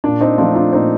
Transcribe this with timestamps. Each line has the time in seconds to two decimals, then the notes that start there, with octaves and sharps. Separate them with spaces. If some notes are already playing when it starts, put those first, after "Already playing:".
0.04 A#2 D4
0.21 C4 D#4
0.38 F3 A3 D4 F4
0.55 D4 F4
0.73 A#2 C4 D#4